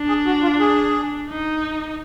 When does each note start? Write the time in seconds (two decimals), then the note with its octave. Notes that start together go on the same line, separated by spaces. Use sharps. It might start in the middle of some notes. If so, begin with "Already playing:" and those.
Already playing: D4
0.08 G#4
0.26 F#4
0.43 F4
0.60 G#4
1.29 D#4